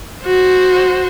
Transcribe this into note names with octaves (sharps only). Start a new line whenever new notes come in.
F#4 C5